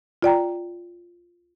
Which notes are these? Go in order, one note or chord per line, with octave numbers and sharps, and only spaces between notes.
F4 D5 G5 A#5